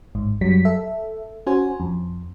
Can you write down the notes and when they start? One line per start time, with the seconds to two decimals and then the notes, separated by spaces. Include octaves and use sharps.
0.15 A1 G#2
0.41 F#2 F#3 G3 B6
0.65 A4 E5
1.47 C#4 F#4 C5 G#5
1.80 F2